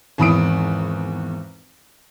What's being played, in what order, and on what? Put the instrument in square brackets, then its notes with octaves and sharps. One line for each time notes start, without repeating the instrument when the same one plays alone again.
[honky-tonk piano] G#1 E2 B5 D#6 D7